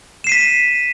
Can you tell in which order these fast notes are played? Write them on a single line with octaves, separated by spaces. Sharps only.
E7 C7 D#7 B6